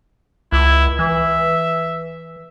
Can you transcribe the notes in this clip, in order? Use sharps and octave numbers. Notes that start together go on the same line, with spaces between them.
C#2 E4
E3 E5